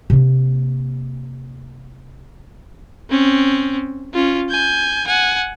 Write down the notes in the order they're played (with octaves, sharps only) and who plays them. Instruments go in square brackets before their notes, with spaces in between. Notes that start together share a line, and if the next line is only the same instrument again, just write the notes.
[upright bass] C3 A#3
[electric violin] C4 C#4
C#4 F4
G#5 G6
F#5 G#5